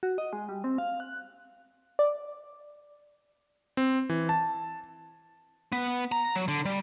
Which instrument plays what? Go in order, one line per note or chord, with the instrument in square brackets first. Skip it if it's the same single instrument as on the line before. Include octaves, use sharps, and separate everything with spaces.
[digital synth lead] F#4
D#5
G#3
G3
C4
F5
F#6
[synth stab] D5
[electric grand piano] C4
E3
A5
[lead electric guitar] B3
A#5
F#3
D3
G3